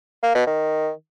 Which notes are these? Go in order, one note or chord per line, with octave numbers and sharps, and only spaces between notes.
A#3
B2
D#3